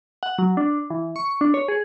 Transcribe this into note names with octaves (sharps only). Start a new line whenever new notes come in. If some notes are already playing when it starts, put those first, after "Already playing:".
F#5
F#3
D4
E3
C#6
D4
C#5
G#4